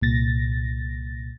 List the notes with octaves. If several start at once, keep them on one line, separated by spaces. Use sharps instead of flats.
C2 A#2 A6 A#6